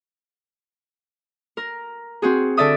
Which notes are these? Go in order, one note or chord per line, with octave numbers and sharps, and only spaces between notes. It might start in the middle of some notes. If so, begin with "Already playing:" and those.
A#4
C4 F#4 G#4
D3 A4 D5 E5 D#6